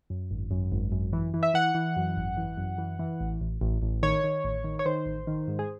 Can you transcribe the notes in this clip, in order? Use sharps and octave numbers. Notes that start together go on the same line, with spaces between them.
F#2
G#1
F#2
G#1
F#2
E3
E3
E5
E3 F#5
E3
F#2
G#1
E3
F#2
E3
E3
A1
A1
A1
A1
D#3 C#5
D#3
A1
D#3
C#5
D#3 C5
A1
D#3
G#2
G#4